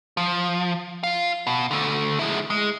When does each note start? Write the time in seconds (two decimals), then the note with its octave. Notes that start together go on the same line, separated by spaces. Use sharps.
0.17 F3
1.03 F4 F5
1.47 B2
1.71 D3 A3
2.19 G#3 E4
2.50 G#3